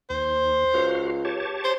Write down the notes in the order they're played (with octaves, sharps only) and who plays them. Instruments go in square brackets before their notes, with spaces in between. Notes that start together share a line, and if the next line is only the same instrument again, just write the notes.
[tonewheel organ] D#2 [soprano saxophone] C5
[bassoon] C#2 [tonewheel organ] F#4 F5
[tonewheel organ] G4 C#5 A5
[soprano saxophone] C5